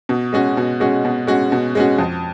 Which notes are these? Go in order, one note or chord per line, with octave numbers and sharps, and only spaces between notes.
B2
G#3 C#4 F#4
B2
G#3 C#4 F#4
B2
G#3 C#4 F#4
B2
G#3 C#4 F#4
F2